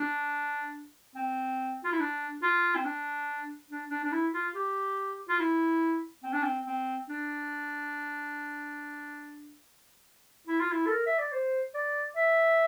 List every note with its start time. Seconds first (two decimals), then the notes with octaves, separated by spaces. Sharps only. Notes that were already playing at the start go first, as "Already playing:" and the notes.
Already playing: D4
1.16 C4
1.84 F4
1.92 E4
2.00 D4
2.42 F4
2.75 C4
2.84 D4
3.70 D4
3.90 D4
4.04 D4
4.12 E4
4.34 F4
4.54 G4
5.29 F4
5.39 E4
6.23 C4
6.33 D4
6.43 C4
6.66 C4
7.09 D4
10.47 E4
10.60 F4
10.72 E4
10.86 A4
10.89 A#4
11.07 E5
11.19 D5
11.32 C5
11.74 D5
12.16 E5